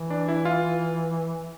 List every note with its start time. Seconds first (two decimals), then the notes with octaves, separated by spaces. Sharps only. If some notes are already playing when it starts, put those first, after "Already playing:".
Already playing: E3
0.10 D4
0.28 E4
0.45 F4